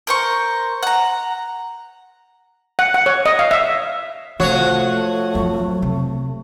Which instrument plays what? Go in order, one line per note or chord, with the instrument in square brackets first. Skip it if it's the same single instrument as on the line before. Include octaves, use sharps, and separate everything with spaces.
[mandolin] A#4 C5 C#6
F#5 A#5
[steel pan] F#5
F#5
C#5
D#5
F5
E5
[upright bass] C3 [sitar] F3 F#4 C#5 [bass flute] A3
[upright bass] F2 F#3
C3